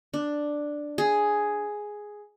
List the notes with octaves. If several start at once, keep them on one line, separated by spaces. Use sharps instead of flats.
D4
G#4